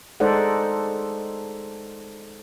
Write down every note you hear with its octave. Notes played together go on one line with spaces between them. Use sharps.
G#3 D#4 A4 C5 D5 F#5